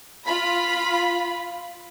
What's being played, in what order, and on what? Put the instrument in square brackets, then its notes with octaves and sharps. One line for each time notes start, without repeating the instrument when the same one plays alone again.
[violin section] F4 B5